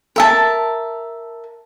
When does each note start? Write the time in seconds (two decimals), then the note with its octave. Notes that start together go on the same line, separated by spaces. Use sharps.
0.16 A#4 E5 A5